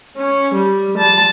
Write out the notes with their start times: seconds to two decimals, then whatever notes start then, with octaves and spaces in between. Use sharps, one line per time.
0.17 C#4
0.55 G3
0.98 A5